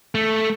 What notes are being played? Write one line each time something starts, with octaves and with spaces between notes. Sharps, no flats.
A3